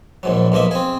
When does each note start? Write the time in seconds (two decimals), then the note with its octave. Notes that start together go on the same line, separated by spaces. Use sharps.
0.23 A#1 G#2 F#3
0.52 B1 F3 A#3 D#5 E5
0.71 C4 G#4